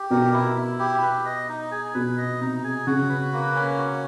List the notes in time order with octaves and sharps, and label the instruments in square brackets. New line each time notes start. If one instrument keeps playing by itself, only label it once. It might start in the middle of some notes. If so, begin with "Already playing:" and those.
Already playing: [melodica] G4
[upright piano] B2 [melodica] A#4
[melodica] E4
E4
G4
B4
D#5
D#4
G#4
[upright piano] B2 [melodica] B4
[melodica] D#5
[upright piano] C3 [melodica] D#4
[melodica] G#4
[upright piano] C#3 [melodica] F#4
[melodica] B4
A#3
C#4
F#4